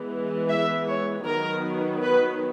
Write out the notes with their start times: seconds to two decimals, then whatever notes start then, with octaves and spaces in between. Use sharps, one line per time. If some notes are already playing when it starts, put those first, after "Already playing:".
Already playing: E3 G#3 B3
0.49 E5
0.88 C#5
1.25 D#3 F#3 B3 A#4
2.03 B4